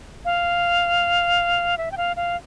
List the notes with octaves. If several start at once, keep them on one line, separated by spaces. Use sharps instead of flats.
F5
E5
G5
F5
F5